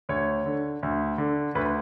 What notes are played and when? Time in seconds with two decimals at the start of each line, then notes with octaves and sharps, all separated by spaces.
0.09 D2 C#5
0.46 D3
0.83 D2
1.18 D3
1.55 D2 B4